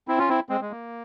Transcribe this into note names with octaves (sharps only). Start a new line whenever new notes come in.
C4 E4
C#4 F4
C4 E4
G#3 C4
G#3
A#3